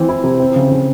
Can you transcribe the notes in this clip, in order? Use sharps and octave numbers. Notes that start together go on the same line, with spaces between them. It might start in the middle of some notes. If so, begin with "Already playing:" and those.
Already playing: E3 C4
E4
C3
C4
C#3
C#3